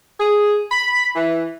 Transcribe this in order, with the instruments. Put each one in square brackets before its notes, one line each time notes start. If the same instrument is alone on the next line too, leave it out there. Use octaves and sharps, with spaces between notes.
[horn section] G#4
B5
E3